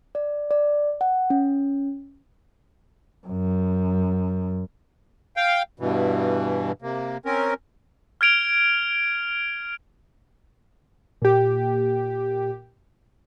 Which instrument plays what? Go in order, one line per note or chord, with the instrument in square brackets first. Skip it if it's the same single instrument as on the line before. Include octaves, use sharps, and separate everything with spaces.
[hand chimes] D5
D5
F#5
C#4
[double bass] F#2
[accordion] F5 G5
G2 B2 E3
C3 A#3
C4 C#4 A#4
[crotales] F6 G#6 D7 F7 G7
[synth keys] A#2 G4